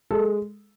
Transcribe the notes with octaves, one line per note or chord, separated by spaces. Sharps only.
G#3 A4